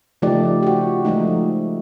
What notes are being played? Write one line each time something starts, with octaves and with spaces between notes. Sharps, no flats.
C#3 F3 A3 D#4 G4 D5
F#4 G4
F3 G#3 A3 D#4